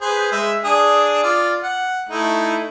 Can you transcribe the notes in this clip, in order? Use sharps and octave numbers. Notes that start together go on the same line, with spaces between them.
G#4 B4 C5
G#3 E5
D4 G#4 D#6
F4 D5 F5
F#5
A3 D#4 E4